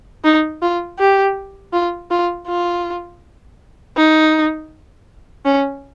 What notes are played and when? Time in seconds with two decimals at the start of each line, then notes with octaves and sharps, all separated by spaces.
0.24 D#4
0.62 F4
0.99 G4
1.73 F4
2.11 F4
2.48 F4
3.96 D#4
5.45 C#4